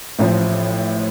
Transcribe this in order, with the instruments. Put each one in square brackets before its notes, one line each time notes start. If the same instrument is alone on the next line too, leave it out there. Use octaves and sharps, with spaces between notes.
[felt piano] A1 A2 F3